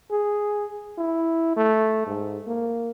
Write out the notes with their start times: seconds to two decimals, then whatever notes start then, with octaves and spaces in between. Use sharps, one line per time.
0.11 G#4
0.98 E4
1.57 A3
2.07 G#2
2.47 A#3